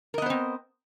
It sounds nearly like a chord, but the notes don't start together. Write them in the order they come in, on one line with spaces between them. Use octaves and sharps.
A#4 D#5 B3 C5 C4